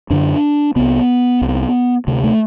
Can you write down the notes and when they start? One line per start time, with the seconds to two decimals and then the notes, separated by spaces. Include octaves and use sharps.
0.10 F#2 D3 D4
0.76 C2 C3 B3
1.41 C2 C3
2.07 D2 C3 A3
2.24 A3